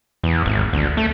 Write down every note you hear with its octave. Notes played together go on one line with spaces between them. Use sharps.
E2
G#1
D2
A3